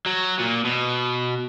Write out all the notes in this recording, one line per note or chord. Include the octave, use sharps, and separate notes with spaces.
F#3
A#2
B2